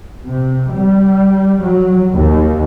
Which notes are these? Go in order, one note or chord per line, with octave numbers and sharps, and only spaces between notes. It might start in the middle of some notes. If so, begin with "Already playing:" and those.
C3
G3
F#3
D#2